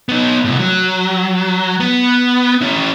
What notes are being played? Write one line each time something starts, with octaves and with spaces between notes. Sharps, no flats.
B3 D#4
C2 A2
F#3
B3
C#4 E4